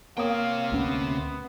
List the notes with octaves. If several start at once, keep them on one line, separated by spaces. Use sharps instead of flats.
C3 A#3 C#5 F5 G5 D#6
D2 B3 C#4